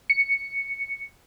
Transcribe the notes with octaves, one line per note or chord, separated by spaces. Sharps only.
C#7